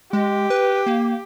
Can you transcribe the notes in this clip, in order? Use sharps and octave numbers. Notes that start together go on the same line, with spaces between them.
G#3 G4
B4
A#3